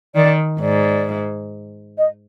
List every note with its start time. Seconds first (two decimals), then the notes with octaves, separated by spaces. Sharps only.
0.15 D#3 D5
0.60 G#2 D5
1.98 D#5